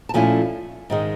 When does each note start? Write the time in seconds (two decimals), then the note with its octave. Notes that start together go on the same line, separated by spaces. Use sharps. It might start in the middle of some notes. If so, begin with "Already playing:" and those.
0.09 A5
0.14 A#2 F3 A3 C#4 E4 G#5
0.90 G#2 D#3 G#3